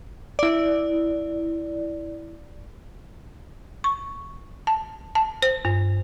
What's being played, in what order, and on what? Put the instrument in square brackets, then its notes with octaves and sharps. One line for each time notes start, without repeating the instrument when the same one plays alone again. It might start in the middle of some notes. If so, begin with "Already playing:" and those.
[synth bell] E4 D5
[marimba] C#6
A5
A5
C5
G2